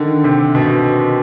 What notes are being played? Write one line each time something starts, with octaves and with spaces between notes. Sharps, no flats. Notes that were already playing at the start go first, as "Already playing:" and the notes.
Already playing: D3 D#3
C3
B2